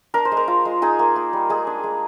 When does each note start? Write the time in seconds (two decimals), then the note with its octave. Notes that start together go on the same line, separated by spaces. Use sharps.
0.14 D4 A#4
0.25 C5
0.32 G#3
0.37 A#4
0.48 F4
0.65 G#3
0.82 D#4 G#4
0.99 A#3
1.16 A#3
1.33 G3
1.49 G#3 G#4
1.67 D4
1.84 G#3